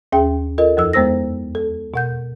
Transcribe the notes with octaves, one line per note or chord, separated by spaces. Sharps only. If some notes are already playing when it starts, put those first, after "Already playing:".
D#2 C#4 G#4 G5
F4 A4 A#4 D#5
F2 F3 A4 E6
E2 G#3 B3 C5 E6 A#6
A4
B2 F#5 G6